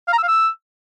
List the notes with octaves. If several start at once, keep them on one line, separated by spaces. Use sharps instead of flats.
F5
A#5
E6
F5
E6